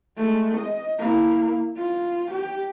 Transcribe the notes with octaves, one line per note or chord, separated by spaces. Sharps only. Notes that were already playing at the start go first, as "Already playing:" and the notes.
G#3 A3
D#5
A#3 E4
F4
G4